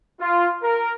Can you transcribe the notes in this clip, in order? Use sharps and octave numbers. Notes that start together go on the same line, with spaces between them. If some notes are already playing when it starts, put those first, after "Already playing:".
F4
A#4